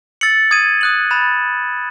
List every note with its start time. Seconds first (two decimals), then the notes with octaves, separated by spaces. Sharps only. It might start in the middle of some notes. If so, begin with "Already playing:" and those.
0.21 E6 A6 C#7 F#7
0.51 D#6 G#6 D#7
0.81 D#6 F#6 C#7 F#7
1.10 B5 F#6 A6 E7